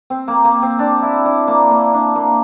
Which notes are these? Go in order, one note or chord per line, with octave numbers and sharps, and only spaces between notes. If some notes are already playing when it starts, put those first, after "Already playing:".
C4
A#3
A#3
C4
D4
E4
D4
A#3
A#3
D4
A#3